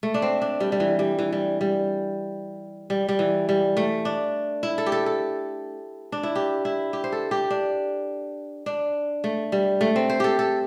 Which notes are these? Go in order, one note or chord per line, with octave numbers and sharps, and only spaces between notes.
A3
D4
C4
D4
G3
G3
E3
G3
E3
G3
G3
G3
G3
E3
G3
A3
D4
E4
A4
G4
A4
A4
D4
E4
G4
E4
G4
C5
A4
G4
D4
D4
A3
G3
A3
C4
C5
G4 A4
A4